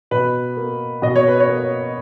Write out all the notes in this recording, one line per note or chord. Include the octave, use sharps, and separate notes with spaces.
B2 B4
A#3
B2 D#5
C#5
B4
C#5
A#3